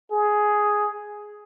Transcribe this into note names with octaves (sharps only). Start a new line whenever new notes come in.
G#4